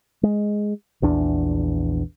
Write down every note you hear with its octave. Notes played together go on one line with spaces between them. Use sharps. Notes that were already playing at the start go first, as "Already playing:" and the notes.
G#3
A#1 E2 D4